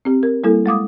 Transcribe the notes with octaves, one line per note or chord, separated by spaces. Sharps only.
C4 G4
A#4
G3 A#3 E4 A4
G#3 F5 D6 D#6